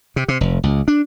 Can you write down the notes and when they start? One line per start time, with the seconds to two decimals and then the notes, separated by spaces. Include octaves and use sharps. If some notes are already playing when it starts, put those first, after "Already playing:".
0.16 C3
0.28 C3
0.41 F1
0.63 C#2
0.88 D4